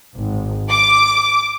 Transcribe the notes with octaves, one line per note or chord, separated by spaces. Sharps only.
G#1
D6